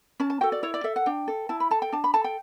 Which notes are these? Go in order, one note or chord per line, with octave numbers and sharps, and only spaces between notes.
C#4 A5
A5
F#4 A4 G5
D5
E4 C#5
D5
A4 E5
F#5
D4 G5
A4
E4 A5
B5
A4 A5
G5
D4 A5
B5
A4 A5
G5